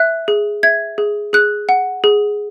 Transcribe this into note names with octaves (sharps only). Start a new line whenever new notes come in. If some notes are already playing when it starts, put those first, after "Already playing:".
Already playing: E5 F#6
G#4
E5 G#6
G#4
G#4 F#6
F#5
G#4